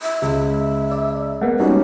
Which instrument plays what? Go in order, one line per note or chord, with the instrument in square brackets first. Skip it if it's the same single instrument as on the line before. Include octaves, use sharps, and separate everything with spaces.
[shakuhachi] E5
[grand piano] C#2 [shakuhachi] E5
[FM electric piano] D5
[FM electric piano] G#3 A#3 B3 [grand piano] F#5
[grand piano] G3 C#4 D#4 [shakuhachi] F#4